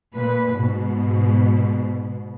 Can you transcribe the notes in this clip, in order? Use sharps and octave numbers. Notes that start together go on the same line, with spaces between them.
A#2 B4
G#2 B2